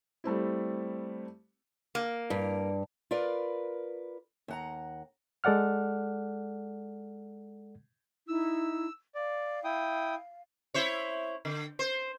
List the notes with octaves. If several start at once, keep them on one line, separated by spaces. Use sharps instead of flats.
G3 A3 C4 E4
A#3
G2
F4 A#4 B4 D5
D#2 F#5 A#5
G#3 A4 D5 F#5 F6
D#4 E4 E6
D5 F5
E4 G5 D#6
E4 C5 C#5
D3
C5